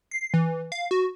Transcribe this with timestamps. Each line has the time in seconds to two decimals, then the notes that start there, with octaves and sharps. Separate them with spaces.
0.11 C7
0.34 E3
0.72 F5
0.91 F#4